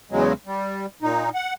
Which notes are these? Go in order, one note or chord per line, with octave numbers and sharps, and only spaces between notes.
E2 C#3 F#3 G#3
G3
A#2 D#4
F#5